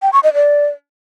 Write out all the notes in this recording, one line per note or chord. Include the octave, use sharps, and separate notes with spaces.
G5
C#6
D#5
D5